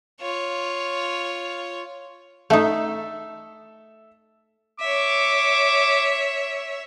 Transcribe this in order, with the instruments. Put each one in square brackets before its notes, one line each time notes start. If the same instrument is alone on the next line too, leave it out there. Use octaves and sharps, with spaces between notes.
[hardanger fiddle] F4 C#5
[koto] A3 D#4 [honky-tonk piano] A4 E5
[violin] C#5 E5 [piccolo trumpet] D6